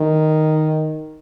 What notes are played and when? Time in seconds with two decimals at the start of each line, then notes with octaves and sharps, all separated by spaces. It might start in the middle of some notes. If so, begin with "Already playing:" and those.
Already playing: D#3